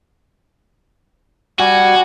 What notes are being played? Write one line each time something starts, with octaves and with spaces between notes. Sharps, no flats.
G3 F#4 G#5